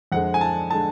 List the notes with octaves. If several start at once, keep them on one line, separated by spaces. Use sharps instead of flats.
F2 D3 G#3 F#5
G#5
A5
D3 G#3 A5